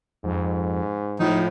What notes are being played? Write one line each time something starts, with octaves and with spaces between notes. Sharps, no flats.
F2 G#2
A2 F3 D#4